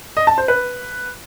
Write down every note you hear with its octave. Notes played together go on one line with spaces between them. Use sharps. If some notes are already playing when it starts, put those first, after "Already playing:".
D#5
A5
C5
B4